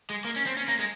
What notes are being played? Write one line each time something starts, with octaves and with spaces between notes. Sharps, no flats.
G#3
A#3
C#4
C4
C#4
A#3
G#3